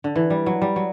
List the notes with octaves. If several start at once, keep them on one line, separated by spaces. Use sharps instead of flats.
D3
E3
G3
F#3
G3
F#3